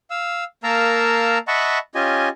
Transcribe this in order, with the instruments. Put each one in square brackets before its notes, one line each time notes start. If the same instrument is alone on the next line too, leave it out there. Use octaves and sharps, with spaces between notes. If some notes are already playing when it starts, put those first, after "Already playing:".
[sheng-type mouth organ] F5 E6
A#3 A#4 F5 A5 A#5 E6
D#5 E5 F#5 A5 B5 C#6
C#4 F4 G4 D#5 G#5